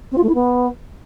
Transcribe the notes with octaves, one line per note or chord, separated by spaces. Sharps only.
C4
F4
A3
E4
B3